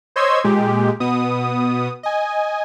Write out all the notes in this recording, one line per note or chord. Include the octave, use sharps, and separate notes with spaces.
C5 C#5 D#5 C6 E6 G#6
A#2 G#3 G4
B2 B3 D#6
D#5 G#5